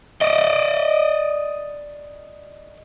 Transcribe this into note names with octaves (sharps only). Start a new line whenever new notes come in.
D5 D#5